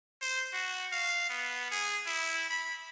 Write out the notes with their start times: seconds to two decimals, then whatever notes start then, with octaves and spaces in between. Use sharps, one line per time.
0.21 C5
0.53 F#4
0.92 F5
1.29 B3
1.71 G#4
2.06 E4
2.50 B5